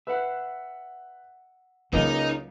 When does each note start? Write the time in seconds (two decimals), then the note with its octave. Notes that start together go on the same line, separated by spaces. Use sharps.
0.07 B4 E5 F#5
1.93 C#2 C#3 F#3 A#3 D#4